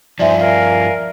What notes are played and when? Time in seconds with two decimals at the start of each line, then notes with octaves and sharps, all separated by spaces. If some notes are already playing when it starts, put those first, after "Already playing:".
0.19 G2 F3 D#4 C5 D5 E5 G#5
0.39 A#4 F5 G#5